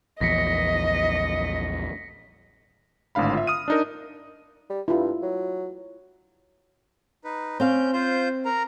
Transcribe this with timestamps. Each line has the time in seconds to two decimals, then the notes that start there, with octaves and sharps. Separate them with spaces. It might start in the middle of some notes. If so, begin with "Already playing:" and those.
0.21 A#1 E2 D#5 A#6 B6 C#7
3.15 G#1 A2 D3 F5 B5
3.33 F4 E5
3.47 D#6 F6 D#7
3.68 D4 D#4 A#4
4.70 G3
4.88 G2 E4 F4
5.22 F#3
7.24 D#4 B4
7.60 C4 C#4 F5 G6
7.93 F4 C5 G6
8.45 A#4 A#5